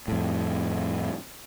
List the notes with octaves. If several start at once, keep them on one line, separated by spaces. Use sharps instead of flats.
F2 A2